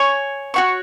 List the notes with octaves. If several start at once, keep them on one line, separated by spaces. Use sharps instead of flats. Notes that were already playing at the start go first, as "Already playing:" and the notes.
Already playing: C#5 G#5 C#6
F#4 C#5 F#5 C#6